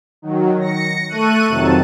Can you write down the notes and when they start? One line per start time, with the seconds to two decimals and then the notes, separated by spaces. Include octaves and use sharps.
0.22 D#3 F#3
0.59 A#6 C#7
1.08 A3 A4 C#6 F#6 D#7
1.47 F2 C3 D#3 F#3 A5